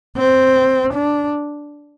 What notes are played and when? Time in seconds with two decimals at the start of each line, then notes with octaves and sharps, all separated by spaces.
0.17 C4
0.94 D4